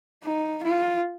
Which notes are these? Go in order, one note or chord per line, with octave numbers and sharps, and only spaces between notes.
D#4
F4